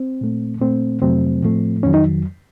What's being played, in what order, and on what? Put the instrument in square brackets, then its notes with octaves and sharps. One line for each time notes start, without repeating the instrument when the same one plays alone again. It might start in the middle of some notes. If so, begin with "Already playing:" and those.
Already playing: [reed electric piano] C4
A#2 A3
A#2 A3 C4
F2 C3 F#3 A3 C4
A2 F3 A3
F2 D#3 F#3 C#4
D#4